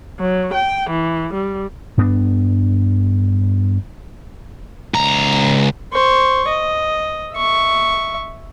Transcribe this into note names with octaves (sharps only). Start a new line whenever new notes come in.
F#3
G5
E3
G3
G2 B3 D4
C#2 A#5
C5 C#6
D#5
E5 C#6